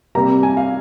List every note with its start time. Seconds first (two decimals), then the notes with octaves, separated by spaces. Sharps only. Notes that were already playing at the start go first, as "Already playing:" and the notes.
0.15 C3 G3 A#3 A#5
0.43 G#5
0.57 F5